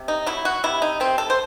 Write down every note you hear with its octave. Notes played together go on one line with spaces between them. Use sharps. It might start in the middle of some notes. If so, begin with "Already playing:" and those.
Already playing: C3
D#4
F#3 E4
F#4
C3 E4
D#4
C3 C4
A4
C5